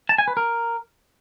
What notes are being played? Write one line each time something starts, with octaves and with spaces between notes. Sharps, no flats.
A5
G#5
B4
A#4